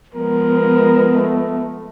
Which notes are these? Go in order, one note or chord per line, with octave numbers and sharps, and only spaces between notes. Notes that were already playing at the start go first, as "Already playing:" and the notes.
F3 G#3 B3 A#4
A3